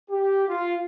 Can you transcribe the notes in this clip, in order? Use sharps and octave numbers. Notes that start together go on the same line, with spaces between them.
G4
F4